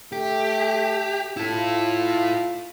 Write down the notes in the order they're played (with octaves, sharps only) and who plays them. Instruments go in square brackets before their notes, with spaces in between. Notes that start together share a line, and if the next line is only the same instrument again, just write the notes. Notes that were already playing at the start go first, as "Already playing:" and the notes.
[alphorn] A3 [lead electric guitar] G4
[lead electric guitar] E4 A4 [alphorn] F4